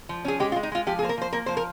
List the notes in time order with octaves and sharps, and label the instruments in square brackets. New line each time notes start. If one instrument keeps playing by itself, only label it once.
[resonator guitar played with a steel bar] F3
C#4 G#4
G#3 G4
F4
G#3
D#4
G#3 F4
F3 G4
G#4
A#3 C5
A#4
F3 C5
A#3 A#4
F3 C5
A#4